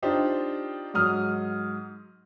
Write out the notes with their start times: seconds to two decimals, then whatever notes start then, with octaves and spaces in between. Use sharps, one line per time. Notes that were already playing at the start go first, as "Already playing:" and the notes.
0.02 D4 D#4 F4 G4 C5
0.94 G#2 F#3 D#6 F6